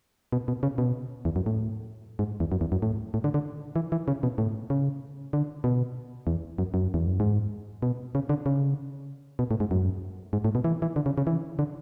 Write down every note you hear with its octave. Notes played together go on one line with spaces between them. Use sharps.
B2
B2
C#3
B2
E2
F#2
A2
G#2
E2
F#2
E2
F#2
A2
A2
D3
D3
E3
E3
C#3
B2
A2
C#3
D3
B2
E2
F#2
F#2
E2
F#2
G#2
B2
C#3
D3
C#3
B2
A2
G#2
F#2
G#2
A2
B2
E3
E3
D3
C#3
C#3
E3
D3